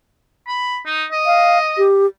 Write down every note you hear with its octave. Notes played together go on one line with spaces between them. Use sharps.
B5
D#4
D#5
F5
G4